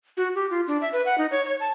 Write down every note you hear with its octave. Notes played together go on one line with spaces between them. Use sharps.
F#4
G4
F4
D4
E5
B4
F#5
D#4
C#5
C#5
A5